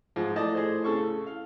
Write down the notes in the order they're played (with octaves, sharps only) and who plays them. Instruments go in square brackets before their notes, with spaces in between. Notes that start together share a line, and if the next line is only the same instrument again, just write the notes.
[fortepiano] G#2 [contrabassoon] F3
[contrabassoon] A2 [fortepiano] D5 D#5 A5
[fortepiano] G#4 C5
C#3 A4 C#6
F5